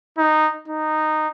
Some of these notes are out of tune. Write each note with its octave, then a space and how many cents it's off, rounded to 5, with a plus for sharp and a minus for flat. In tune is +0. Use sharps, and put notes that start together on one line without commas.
D#4 -10
D#4 -10